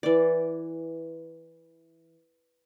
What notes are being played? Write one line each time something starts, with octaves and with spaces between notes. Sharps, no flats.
E3 D5